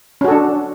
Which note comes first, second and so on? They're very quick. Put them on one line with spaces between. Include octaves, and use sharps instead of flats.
C#4 F#4 A4 D4